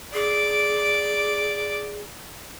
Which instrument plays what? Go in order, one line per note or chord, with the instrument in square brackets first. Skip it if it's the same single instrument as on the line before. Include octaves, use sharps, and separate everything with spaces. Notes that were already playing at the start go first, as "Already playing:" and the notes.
[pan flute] G#4 [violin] D5 D6